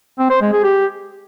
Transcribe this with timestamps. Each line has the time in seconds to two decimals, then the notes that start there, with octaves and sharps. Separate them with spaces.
0.19 C4
0.30 C5
0.41 G#3
0.52 G#4
0.64 G4